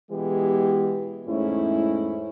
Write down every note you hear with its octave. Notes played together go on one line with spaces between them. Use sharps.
B2 E3 G#3 B3 G4
E2 G#2 A3 C#4 E4